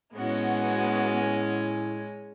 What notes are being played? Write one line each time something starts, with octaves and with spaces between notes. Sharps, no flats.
A2 G#3 B3 C#4 F#4